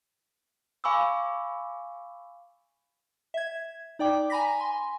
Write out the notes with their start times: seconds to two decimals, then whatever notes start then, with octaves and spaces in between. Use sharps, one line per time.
0.84 F5 G#5 B5 C#6 D6 E6
3.34 E5 G#6
3.99 D#4 D5 G5 D6
4.30 G#5 A#5 B5 A#6 B6
4.59 G#5 C6